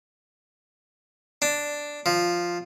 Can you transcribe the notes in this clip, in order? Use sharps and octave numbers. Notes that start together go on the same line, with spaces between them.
D4
F3